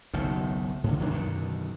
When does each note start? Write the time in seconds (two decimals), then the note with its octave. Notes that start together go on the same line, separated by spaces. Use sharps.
0.14 F#1 B1 A2 D#3
0.84 G#2 D3
0.99 D1 D#3 F#3 D4
1.13 F#2 B2 D3 D#3